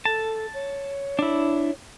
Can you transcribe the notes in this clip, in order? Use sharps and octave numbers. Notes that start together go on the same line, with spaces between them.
A4 A5
C#5
D4 E4